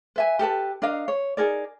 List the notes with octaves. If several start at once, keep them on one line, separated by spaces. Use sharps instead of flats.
B4 E5 G#5
G4 A4 B4 A5
D4 A#4 D#5 F5
C#5
D#4 G#4 A#4 D5